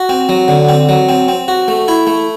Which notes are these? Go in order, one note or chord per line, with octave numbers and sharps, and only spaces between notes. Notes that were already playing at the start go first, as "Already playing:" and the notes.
Already playing: F#4
C4
F#3
D3
C4
F#3
C4
C4
F#4
A3
E4
A3